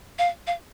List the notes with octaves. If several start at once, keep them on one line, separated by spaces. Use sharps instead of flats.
F5
F5